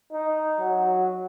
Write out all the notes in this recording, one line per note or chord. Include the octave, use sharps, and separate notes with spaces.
D#4
F#3